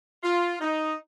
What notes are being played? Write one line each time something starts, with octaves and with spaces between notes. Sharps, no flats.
F4
D#4